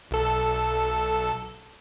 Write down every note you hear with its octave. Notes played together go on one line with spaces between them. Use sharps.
B1 A4